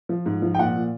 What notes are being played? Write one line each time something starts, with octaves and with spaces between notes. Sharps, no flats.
F3
G#2
F3
G5
A#2 F#5
A#2